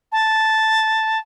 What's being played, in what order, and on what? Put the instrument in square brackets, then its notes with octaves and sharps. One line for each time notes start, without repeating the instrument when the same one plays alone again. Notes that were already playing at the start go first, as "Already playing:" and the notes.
[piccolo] A5